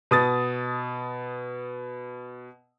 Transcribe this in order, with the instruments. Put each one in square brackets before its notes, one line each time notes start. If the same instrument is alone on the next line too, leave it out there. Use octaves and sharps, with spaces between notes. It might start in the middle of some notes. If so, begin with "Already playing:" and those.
[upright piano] B2 D#6 A6